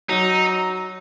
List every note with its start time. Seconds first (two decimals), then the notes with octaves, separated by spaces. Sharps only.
0.09 F#3 D#4